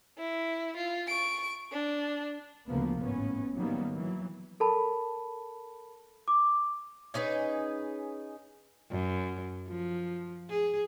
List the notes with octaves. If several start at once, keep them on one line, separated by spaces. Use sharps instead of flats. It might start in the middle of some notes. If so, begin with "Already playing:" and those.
E4
F4
C#6 D7
D4
D2 C#3 F3 A#3 B3
G#1 A2 B3 C#4
D#3 F#3 G3 A#3 B3
E3 F#3
A4 A#4 A5 B5
D6
C#4 D#4 G#4 B4
F#2
F3
G#4